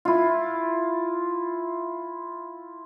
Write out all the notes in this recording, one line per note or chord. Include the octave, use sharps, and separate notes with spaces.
E4 F4